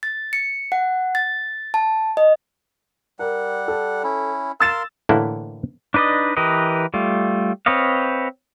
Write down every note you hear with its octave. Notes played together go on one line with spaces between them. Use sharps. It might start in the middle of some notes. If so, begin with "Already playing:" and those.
A6
C#7
F#5
A6
A5
D#5
G3 A#4 F#5
A4
C#4 E4
A#4 F5 C6 E6 A6 E7
A2 D3 E3 A#3 E4
D4 D#4 B4 D5 D#5
E3 G4 A#4 B4 D#5
G3 A3 F4
C4 B4 C#5 D#5 F5